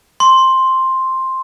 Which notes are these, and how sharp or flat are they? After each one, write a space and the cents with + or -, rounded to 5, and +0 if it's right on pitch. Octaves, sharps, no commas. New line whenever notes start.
C6 +5